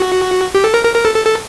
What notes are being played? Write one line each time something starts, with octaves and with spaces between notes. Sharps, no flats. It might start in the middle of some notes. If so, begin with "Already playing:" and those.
Already playing: F#4
G4
A4
A#4
A#4
A#4
A4
A4
A4